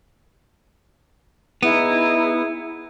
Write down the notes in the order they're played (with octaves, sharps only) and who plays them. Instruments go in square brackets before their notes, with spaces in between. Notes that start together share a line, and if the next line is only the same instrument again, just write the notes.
[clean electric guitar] B3 [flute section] D#4 E4 G#4